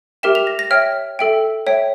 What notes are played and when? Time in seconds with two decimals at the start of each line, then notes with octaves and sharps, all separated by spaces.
0.23 G4 A#4 E5 G5 E7
0.35 F7
0.47 A#6
0.59 A#6
0.70 C#5 E5 G5 F6
1.19 A4 E5 G5
1.67 C#5 E5 G5